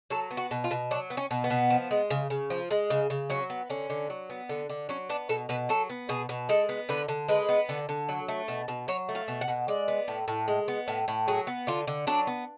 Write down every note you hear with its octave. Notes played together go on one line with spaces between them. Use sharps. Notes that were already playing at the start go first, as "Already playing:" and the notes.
F#3 A4
B3
F#4
B2
F4
B2
F#3 D4
B3
C#4
B2
B3
B2
F3
G#3
C#3
C#3
F3
G#3
C#3
C#3
F#3 C#4
B3
D3 C#4
D3
F#3
B3
D3
D3
F#3 C#4
B3 D4
B2 A4
B2 B4
F#3 A4
B3
B2 G#4
B2
G#3 A4
B3
D3 B4
D3
G#3 B4
B3
D3
D3
F#3
A3
B2
B2
F#3 C#5
A3
F5
B2
F#5
B2
G#3 D5
B3
A2
A2
G#3
B3
A2
A2
F#3 G#4
B3
D3 F4
D3
F#3 D4
B3